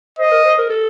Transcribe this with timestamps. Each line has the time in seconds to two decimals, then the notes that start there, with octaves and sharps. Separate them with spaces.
0.19 C5 D#5
0.31 A#4
0.45 C5
0.58 A#4
0.70 A4